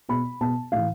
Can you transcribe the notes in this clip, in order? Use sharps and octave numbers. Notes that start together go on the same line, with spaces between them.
B2 B5
B2 A5
A2 E3 F5